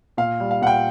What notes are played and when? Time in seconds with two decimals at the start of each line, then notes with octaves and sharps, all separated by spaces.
0.17 A#2 F5
0.40 G3
0.51 F5
0.62 A#2 F#5
0.67 G5